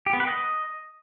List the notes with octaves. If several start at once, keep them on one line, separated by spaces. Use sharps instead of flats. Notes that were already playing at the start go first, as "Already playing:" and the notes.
G4
B3
B4
D#5